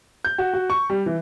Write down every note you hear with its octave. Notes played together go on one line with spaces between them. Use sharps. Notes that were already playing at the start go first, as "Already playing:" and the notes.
G6
F#4
F#4
C#6
G3
E3